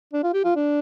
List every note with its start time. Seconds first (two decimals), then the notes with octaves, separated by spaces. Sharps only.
0.13 D4
0.23 F4
0.34 G4
0.44 F4
0.55 D4